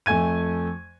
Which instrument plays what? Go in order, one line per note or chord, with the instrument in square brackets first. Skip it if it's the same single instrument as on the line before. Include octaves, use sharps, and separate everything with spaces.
[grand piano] F2 A3 G#5 G#6 D#7